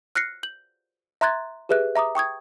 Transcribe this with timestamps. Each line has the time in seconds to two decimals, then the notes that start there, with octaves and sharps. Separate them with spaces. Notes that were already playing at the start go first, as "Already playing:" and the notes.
0.15 F6 F#6 A#6 C7 C#7
0.43 G6 F#7
1.21 E5 A#5 C6 F#6 G#6 A6
1.69 G4 G#4 B4 E5 F#6
1.96 E5 A#5 D6 D#6
2.15 G5 C#6 D#6 G#6